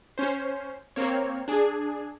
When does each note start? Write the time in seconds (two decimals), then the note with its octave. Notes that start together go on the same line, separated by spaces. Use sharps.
0.18 C#4 C5
0.96 A#3 C4 C#5
1.48 D4 G#4